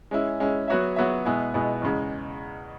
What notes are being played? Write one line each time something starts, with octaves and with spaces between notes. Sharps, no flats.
G#3 C#4 E4
G#3 C#4 E4
F#3 B3 F#4 C#5 E5
F#3 B3 F#4 C#5 E5
B2 G#3 B3 E4 G#4
B2 G#3 B3 E4 G#4
E2 C#3 G#3